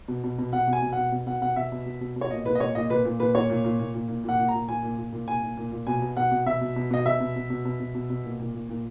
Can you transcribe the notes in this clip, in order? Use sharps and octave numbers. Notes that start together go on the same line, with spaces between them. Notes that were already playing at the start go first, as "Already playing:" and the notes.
B2
B2
B2
B2 F#5
B2
G#5
B2
B2 F#5
B2
B2 F#5
B2 F#5
B2 E5
B2
B2
B2
B2
C#5
A#2 D#5
A#2 B4
D#5
A#2 C#5
A#2 D#5
A#2 B4
A#2
A#2 B4
A#2 C#5
A#2
A#2
A#2
A#2
A#2
A#2 F#5
A#2
A#5
A#2
A#2 G#5
A#2
A#2
A#2
A#2 G#5
A#2
A#2
A#2
B2 G#5
B2
B2 F#5
B2
B2 E5
B2
B2
B2 D#5
B2 E5
B2
B2
B2
B2
B2
B2
B2
A#2
A#2
A#2
A#2